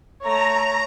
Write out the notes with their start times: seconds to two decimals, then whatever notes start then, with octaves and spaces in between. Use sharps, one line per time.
0.22 A3 C#5 A#5